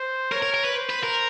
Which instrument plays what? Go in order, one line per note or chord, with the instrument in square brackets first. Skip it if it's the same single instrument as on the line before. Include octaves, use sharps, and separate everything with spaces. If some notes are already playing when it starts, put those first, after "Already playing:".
Already playing: [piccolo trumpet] C5
[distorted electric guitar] A#4 [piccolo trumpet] C#5
[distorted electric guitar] A#4
A#4
B4
[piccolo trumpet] C5
[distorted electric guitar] B4
A#4